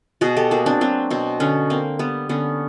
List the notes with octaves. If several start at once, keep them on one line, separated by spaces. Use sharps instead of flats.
B2 F#4 G#4
G4 A4
A#3 F#4 G#4
C4 D4
F#3 C4
B2 C4
D3 B3 C#4
A#3 C4
G3 B3
D3 B3 C#4